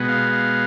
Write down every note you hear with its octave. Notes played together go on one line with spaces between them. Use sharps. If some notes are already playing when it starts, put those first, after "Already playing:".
Already playing: B2 G#3 B3
F5
F5